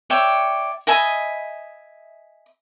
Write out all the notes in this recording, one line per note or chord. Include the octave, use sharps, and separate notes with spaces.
C#5 D5 E5 G5
D#5 E5 G#5 B5